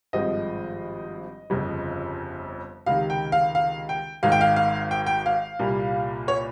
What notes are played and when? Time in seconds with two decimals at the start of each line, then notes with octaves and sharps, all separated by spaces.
0.13 G#1 G2 F3 G#3 C4 D#5
1.50 G1 F2 C#3 F3
2.86 C#2 C3 D#3 F5
3.10 G5
3.32 F5
3.55 F5
3.89 G5
4.23 G#1 G#2 D#3 F5
4.32 G5
4.41 F5
4.56 F5
4.91 G5
5.06 G5
5.26 F5
5.59 C2 A#2 G3 A#3
6.28 C#5